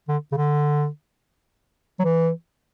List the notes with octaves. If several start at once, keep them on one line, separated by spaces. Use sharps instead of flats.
D3
C#3
D3
F#3
E3